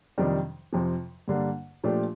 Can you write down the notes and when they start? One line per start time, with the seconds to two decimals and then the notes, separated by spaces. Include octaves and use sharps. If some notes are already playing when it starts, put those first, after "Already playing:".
0.18 F2 C3 D#3 G3 D4
0.73 F2 C3 F3
1.28 G2 D3 G3 A#3 D4
1.84 A#2 F3 A3 D4 G4